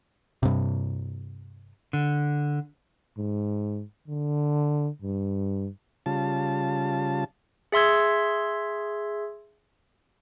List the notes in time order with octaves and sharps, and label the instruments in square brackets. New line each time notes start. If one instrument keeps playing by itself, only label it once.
[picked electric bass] G2 C3
[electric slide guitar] D3
[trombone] G#2
D3
G2
[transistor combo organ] C#3 G3 F4 A5
[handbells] G#4 E5 C6 E6 G#6